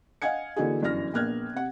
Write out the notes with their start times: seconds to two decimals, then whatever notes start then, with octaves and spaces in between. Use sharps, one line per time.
0.22 D#5 F5 F#5 G#5 G#6 C#7
0.56 D3 E3 A#3 D#4 F#4 G#4
0.82 G1 F#2 E3 F6 A#6
1.14 A#1 A#3 B3 F6 F#6 G#6
1.53 C3 F#5